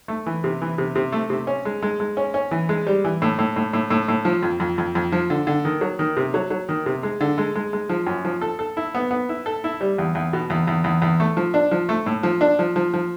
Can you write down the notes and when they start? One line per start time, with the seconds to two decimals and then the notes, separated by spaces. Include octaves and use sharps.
0.08 A3
0.26 E3
0.44 C3
0.62 E3
0.78 C3
0.95 C3
1.12 A3
1.30 C3
1.47 C#4
1.65 G#3
1.83 G#3
2.00 G#3
2.17 C#4
2.34 C#4
2.51 E3
2.69 G#3
2.87 G3
3.05 E3
3.22 A2
3.39 A2
3.56 A2
3.73 A2
3.90 A2
4.08 A2
4.25 F3
4.43 F2
4.60 F2
4.78 F2
4.95 F2
5.12 F3
5.30 D3
5.47 D3
5.65 D#3
5.81 F#3
5.99 D#3
6.17 C3
6.34 F#3
6.50 F#3
6.69 D#3
6.86 C3
7.03 G#3
7.21 D3
7.38 G#3
7.55 G#3
7.73 G#3
7.89 F3
8.07 F#2
8.25 F3
8.41 A4
8.59 A4
8.77 E4
8.95 B3
9.11 B3
9.29 E4
9.46 A4
9.64 E4
9.81 G3
9.98 E2
10.15 E2
10.33 B2
10.50 E2
10.67 E2
10.84 E2
11.02 E2
11.20 A3
11.37 F3
11.54 D4
11.71 F3
11.89 A3
12.06 A2
12.23 F3
12.41 D4
12.59 F3
12.76 F3
12.94 F3